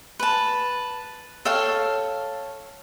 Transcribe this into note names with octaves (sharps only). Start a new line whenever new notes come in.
B4 A5
A4 C#5 F5 G5